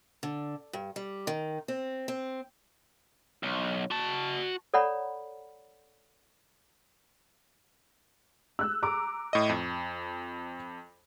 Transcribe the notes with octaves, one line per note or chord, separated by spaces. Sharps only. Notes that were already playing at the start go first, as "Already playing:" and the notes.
D3
G2
G3
D#3
C4
C4
B1
F#4 A5
A4 C#5 D5 F#5 A#5 B5
E6 F#6
A#5 D6 E6
A2 D#5
F2